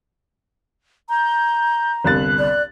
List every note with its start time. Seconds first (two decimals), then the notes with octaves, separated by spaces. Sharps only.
1.09 A#5 G6
2.05 G1 C2 F#6 A6
2.39 D5